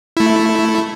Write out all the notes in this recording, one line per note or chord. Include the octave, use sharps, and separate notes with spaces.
A3 E4